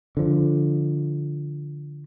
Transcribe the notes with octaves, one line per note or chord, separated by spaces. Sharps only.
D3 F3